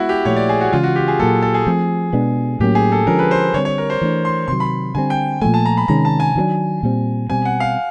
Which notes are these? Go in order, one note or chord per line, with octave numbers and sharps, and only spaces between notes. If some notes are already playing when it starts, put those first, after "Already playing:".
Already playing: G#3 B3 E4 F#4
G4
A#2 F3 A3 C#5
D5
G#4
F#4
C#3 E3 G#3 F4
F#4
G4
G#4
A#2 F#3 A#3 A4
A4
G#4
F3 A3 C4
B2 G#3 B3 D4
A2 F#3 A#3 C#4 G4
G#4
A4
D3 F3 G#3 C#4 A#4
B4
C5
D3 G3 C4 C#5
C#5
A#4
C5
E3 A3 D4
C6
C3 D#3 F#3 C6
B5
D3 G3 C4 G#5
G5
A#2 F3 A3 G#5
A5
A#5
B5
C3 D#3 G#3 C#4 A#5
A5
G#5
D#3 F#3 A#3 D4
A#2 G3 C4
B2 G3 C4 G#5
F#5
F5